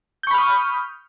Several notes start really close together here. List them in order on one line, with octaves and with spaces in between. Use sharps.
G6 C#6 B5 F6 D#6